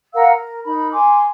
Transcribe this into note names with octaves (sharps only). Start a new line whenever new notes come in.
A#4 F5 F#5 E6
A#4
D#4 A#4 B5
G#5 C6 D6